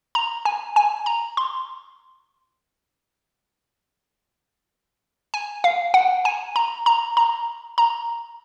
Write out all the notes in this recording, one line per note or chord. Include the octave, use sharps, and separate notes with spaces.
A#5
G#5
G#5
A#5
C6
G#5
F5
F#5
G#5
A#5
A#5
A#5
A#5